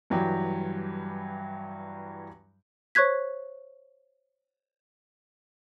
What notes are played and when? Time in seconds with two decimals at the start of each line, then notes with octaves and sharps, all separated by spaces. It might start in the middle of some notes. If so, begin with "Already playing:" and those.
0.10 G2 E3 F#3 G3 G4
2.95 C5 C#5 C#6 F#6 G#6 B6